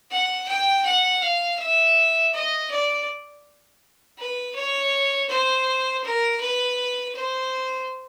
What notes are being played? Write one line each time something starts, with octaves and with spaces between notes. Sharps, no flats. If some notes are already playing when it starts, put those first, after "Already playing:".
F#5
G5
F#5
F5
E5
D#5
D5
B4
C#5
C5
A#4
B4
C5